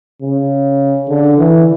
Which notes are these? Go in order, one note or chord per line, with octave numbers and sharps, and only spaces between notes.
C#3
D3
E3